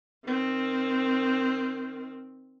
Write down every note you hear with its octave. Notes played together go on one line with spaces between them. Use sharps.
D#3 C4